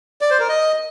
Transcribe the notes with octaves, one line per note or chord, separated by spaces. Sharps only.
D5
C5
A#4
D#5